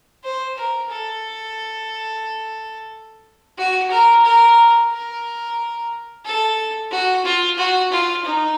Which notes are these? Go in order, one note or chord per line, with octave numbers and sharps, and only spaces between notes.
C5
A#4
A4
F#4
A#4
A#4
A#4
A4
F#4
F4
F#4
F4
D#4